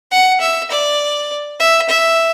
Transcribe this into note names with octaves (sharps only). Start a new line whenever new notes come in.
F#5
E5
D5
E5
E5